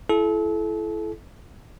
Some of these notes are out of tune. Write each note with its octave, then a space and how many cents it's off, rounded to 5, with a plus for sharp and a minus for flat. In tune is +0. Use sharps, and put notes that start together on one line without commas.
E4 +20 A4 -35